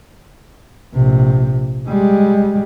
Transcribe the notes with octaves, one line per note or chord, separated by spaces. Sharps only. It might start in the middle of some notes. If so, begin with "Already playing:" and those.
A#1 C3
G3 G#3